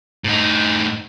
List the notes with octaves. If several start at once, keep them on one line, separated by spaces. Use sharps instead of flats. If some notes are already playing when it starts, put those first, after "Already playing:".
A2 D#4